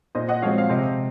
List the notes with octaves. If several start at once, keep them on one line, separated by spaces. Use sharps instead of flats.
A#2 C5 D#5
D#5 F#5
F3 G#3 C4 F#4 C#5 F5
F5
C3 C5 D#5